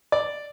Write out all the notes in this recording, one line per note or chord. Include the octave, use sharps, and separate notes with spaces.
D5